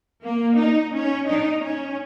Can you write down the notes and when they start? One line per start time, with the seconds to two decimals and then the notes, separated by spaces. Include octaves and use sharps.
0.23 A#3
0.59 D#4
0.94 C#4
1.28 D#4
1.63 C#4